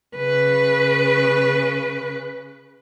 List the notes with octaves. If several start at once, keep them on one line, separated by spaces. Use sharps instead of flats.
C#3 B4